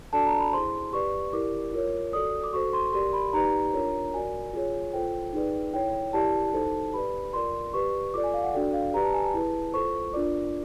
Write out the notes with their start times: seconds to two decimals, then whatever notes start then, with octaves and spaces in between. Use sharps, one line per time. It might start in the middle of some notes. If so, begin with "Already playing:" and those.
0.13 D4 F#4 A4 D5 A5
0.26 A#5
0.40 B5
0.53 E4 G#4 C5 C6
0.93 G4 B4 D5 C#6
1.33 E4 G4 A#4 D5 D6
1.73 F4 A#4 C#5
2.13 F#4 A4 D5 D#6
2.44 D6
2.53 F#4 A4 C5 C#6
2.73 C6
2.93 G4 A#4 D5 C6
3.13 B5
3.33 D#4 G4 B4 D5 A#5
3.74 D4 F4 A#4 C#5
4.14 F#4 A#4 D5 G#5
4.53 F4 G#4 C#5
4.93 F4 A4 C5 G5
5.33 D#4 G#4 B4 D5
5.73 E4 A4 C#5 G5
6.13 E4 G4 A#4 D5 A5
6.53 D#4 F#4 A4 C5
6.94 G4 B4 D5 B5
7.33 F4 A#4 D5 C6
7.73 G4 B4 D5 C#6
8.14 F4 A4 D5 D6
8.24 G#5
8.34 F5
8.43 F#5
8.54 D4 F#4 A4 D5 G5
8.73 F5
8.94 G4 B4 D5 A#5
9.04 A5
9.14 G#5
9.23 A5
9.34 E4 G#4 B4
9.74 F4 A4 C5 C#6
10.13 D4 F4 A#4 D5 D6